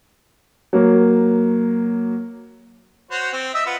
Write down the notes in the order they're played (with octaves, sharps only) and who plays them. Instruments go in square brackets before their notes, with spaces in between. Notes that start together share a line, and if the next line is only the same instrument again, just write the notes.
[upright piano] F#3 A#3
[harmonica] F#4 C5 C#5
C4
D#5 E5 E6
F4 B4 F#5